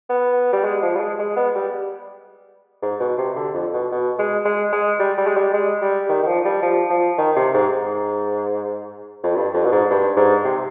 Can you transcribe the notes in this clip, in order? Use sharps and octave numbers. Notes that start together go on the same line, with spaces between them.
B3
G3
G#3
F3
G3
G#3
G#3
B3
G3
G#2
B2
C3
D3
F2
B2
B2
G#3
G#3
G#3
G3
G3
G#3
G3
G#3
G3
D#3
D#3
F3
G3
F3
F3
D#3
C3
G#2
G#2
F2
G2
F2
B2
G#2
G2
G#2
C3